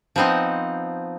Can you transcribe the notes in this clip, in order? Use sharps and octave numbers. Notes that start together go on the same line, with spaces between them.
F3 B3 C4 D#4 D#5